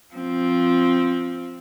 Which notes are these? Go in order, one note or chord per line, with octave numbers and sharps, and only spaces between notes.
F3 C4